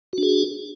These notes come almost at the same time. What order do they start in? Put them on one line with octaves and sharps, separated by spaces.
F#4 D4 G#4